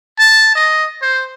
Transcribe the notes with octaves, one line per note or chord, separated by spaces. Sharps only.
A5
D#5
C5